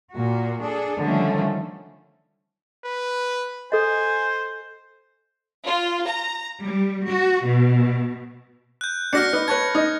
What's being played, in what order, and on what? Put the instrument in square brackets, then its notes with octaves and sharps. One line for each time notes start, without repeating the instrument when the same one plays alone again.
[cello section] A#2 F#4
D4 G#4 A4
D3 D#3 F3 G3 A3 C#4
[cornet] B4
[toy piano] A4 D#5 [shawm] C5 [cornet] G#5
[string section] F4
A#5
G3
F#4
B2
[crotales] F#6 G6
[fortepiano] D4 F#4 [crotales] F6 A#6 C#7
[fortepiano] D#4 B4
[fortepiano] B4 C#5 A5 [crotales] G#6
[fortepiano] D#4